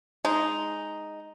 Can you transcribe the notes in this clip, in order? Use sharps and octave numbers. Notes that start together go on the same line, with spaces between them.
G#3 D#4